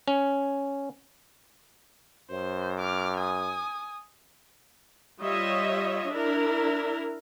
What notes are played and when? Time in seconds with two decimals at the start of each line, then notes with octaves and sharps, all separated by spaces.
0.08 C#4
2.30 F#2 C5
2.80 D6 F6
3.17 G#5 D#6
5.20 G3 F4 C#5 D#5 E5
6.09 D4 E4 A#4